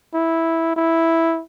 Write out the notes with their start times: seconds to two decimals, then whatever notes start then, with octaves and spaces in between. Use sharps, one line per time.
0.14 E4
0.76 E4